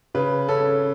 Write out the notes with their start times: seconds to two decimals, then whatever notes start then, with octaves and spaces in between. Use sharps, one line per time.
0.15 C#3 B4
0.48 C#4 A4